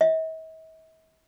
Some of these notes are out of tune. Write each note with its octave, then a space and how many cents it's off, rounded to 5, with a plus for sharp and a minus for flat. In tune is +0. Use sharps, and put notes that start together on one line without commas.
E5 -45